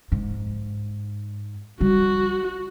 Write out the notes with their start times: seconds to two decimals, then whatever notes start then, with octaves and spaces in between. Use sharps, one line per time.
0.12 G#2
1.81 G3 F#4